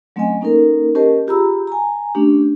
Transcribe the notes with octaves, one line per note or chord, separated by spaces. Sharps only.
F#3 A3 C4 C#4 D#5 G#5
A#3 C#4 D#4 A4 A#4
C#4 G4 A#4 C5 D#5 A5
F4 G4 G#4 A#5 B5 E6
G#5 A#5
A3 C#4 D4 G4